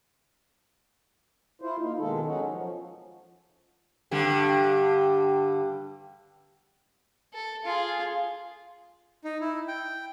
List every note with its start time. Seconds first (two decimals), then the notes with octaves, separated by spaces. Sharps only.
1.62 E4 F4 C5
1.79 A#3 D#4 F4
1.98 B2 D#3 G#3 A4
2.25 F#3 C#4 D#4 F#4
2.49 F3
4.11 G2 D3 G3
7.34 A4
7.64 F4 G#4
9.24 D#4
9.41 E4
9.68 G5